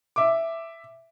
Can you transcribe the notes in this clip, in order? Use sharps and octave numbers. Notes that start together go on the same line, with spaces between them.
E5 D6